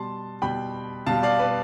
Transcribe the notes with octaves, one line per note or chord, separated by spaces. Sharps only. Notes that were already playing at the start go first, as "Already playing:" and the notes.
Already playing: B2 G3 A5 C6
B2 G3 G5 B5
B2 G3 F5 A5
D5 F5
B4 D5